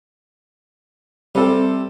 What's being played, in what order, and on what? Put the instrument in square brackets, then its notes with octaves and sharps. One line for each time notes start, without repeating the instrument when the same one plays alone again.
[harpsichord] C3 [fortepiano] G3 A4